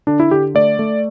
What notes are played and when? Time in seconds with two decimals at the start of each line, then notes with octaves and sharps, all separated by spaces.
0.07 D3 D4
0.20 E4
0.31 D3 G4
0.55 A3 D5
0.79 A3